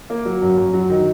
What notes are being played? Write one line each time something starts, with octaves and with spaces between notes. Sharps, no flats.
A#3
F#3
F#2
F#2
F#3
D#3